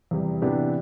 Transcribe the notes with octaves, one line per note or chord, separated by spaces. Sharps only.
E2 C3 G3
C3 E3 B3 D4 G4